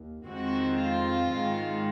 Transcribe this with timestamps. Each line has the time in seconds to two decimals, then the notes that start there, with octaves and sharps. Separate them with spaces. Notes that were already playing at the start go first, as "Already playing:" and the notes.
Already playing: D#2
0.25 F2 D#3 G#3 C4 F#4
0.78 F4
1.32 G#2 D#3 G#3